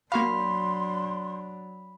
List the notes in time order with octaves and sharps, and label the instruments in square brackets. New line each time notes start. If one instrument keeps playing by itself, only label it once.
[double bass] F#3 D4 [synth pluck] A#3 F#4 F5 [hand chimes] B5 [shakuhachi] C6